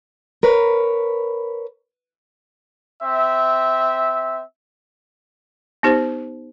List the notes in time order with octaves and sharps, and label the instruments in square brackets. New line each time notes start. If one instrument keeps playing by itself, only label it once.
[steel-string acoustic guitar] A#4 B4 C#5
[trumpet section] C4 E5
[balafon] B3 D#4 G4 C5